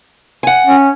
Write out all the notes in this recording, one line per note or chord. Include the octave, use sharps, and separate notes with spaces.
F#5 G#5
C#4